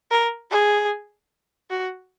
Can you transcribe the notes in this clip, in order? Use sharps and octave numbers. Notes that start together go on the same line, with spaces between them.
A#4
G#4
F#4